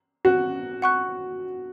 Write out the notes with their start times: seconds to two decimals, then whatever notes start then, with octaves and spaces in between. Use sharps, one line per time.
0.25 F#4
0.82 F#5 C#6 F#6